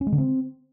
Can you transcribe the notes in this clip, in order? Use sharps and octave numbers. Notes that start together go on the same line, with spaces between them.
C#4
G#3
D3
C4